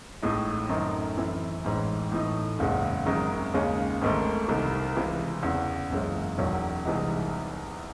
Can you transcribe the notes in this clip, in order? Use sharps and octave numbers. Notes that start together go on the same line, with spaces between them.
A1 A2 G#3 D#4
F#2 D#3 A3 C4 D#4
F#2 E3 C4 E4
A1 G#2 E3
A2 E3 A3 D#4
F#1 E2 C#3 G#3
G#1 F#2 D#3 G#3 D#4
D#2 C#3 G#3 C#4
G#1 G#2 D#3 A3
C2 C3 D#3
C#2 C3 E3
E2 C#3 E3
F#1 F#2 E3 G#3 C#4
E1 E2 D#3 F#3 C#4
C2 C3 E3 G#3 D#4